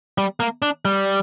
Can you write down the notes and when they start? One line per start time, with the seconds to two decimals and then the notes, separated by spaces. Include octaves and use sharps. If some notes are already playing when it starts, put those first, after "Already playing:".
0.18 G3
0.40 A#3
0.62 D4
0.85 G3